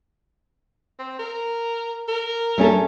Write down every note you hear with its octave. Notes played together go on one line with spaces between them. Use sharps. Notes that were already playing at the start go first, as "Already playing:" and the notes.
C4
A#4
A#4
A3 C#4 A4